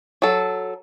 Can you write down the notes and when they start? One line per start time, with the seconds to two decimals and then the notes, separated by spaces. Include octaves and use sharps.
0.22 F#3 A4